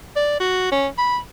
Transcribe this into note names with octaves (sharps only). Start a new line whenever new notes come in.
D5
F#4
C#4
B5